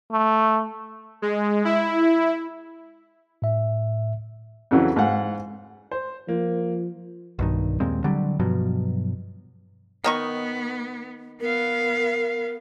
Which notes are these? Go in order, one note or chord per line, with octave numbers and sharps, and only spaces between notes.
A3
G#3
E4
A2 E5
F2 C#3 E3 F#3
G#2 F5 F#5
C5
F3 A#3
B1 G2 D#3
D#2 A#2 G#3 C4
D3 F#3 G3
G2 B2 F3 F#3
D#3 B3 D#4 C#6
B3 A#4 F5